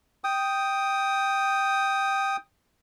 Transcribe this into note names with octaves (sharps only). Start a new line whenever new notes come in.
G5 D#6